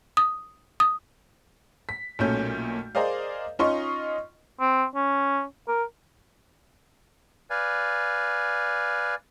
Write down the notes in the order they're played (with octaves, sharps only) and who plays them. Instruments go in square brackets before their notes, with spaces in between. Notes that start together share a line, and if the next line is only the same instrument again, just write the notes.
[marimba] D#6
D#6
[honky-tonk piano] B6
B1 A#2 A3 C#4 G6
G#4 A#4 C5 D5 D#5 F5
C#4 D#4 F4 D#5 C6 C#6
[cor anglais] C4
C#4
A#4
[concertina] B4 D5 F5 G#5